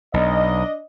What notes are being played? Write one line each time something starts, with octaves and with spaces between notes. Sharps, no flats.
B1 D4 D#5